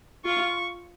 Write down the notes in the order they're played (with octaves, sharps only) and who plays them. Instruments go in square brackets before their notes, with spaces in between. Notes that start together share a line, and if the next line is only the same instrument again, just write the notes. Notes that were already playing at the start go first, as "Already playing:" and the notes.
[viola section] F4 [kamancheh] C#6